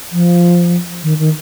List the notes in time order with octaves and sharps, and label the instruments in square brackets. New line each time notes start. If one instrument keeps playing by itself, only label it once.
[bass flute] F3
D#3
D#3